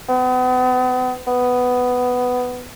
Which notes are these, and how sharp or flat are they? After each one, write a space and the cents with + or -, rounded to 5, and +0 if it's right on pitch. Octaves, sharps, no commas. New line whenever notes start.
B3 +40
B3 +10